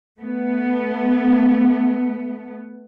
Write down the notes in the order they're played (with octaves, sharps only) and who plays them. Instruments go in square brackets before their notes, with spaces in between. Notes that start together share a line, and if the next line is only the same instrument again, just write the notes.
[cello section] A3 B3